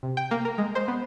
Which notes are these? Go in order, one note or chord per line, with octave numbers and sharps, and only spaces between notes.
C3
G5
A#3
A#4
G#3
C5
B3